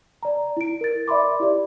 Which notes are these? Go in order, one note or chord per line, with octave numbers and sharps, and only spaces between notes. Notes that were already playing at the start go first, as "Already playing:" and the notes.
D5 A#5
E4 D7
A#4 A6
D5 E5 B5 C6 D6
E4 G4 D5